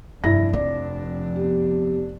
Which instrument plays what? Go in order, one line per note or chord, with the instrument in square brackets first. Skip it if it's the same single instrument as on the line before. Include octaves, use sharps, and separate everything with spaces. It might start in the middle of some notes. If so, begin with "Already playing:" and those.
[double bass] F1 D4 [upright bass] G2 [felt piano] E4 A#6
[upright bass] F3 C4 [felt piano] D5
[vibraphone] B3 G4